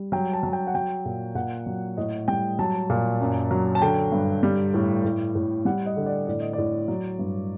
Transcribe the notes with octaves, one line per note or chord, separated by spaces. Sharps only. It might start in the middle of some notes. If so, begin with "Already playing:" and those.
Already playing: G3
F#3 G5
A5
F#3
A5
G5
F#5
F#3 G5
A#2
A#2 F#5
F#3
A2 D#5
G3 G5
F#3 A5
A#2
F#2
F#3
A5
D3 G5
G2
G3
A2
A2
A2
G3 F#5
D#5
D3
D5
A2 D5
D#5
A2 D5
F#3
G2